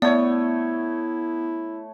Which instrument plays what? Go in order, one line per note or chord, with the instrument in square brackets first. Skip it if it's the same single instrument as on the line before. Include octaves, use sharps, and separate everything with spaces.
[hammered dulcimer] A3 C#5 [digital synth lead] B3 [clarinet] E4 [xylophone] D5